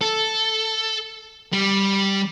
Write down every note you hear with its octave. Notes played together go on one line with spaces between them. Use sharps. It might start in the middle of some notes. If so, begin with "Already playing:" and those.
A4
G3